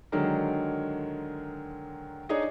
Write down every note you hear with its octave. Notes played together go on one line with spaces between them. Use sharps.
D3 D#3 F#3 G#3 A#4
D4 D#4 G#4 C#5 D#5